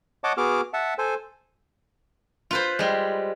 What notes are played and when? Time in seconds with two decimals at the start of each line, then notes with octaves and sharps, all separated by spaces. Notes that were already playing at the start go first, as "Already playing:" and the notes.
0.24 C#5 D#5 F#5 A5 D6
0.37 B3 F#4 G#4 D6 F6
0.73 E5 F#5 A5
0.98 A4 C5 G#5
2.51 F4 B4 C5
2.79 G3 G#3